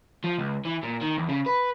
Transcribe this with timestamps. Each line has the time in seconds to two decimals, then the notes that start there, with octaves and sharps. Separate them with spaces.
0.24 F3
0.38 C#2
0.65 E3
0.83 A#2
1.01 D#3
1.18 E2
1.29 C#3
1.46 B4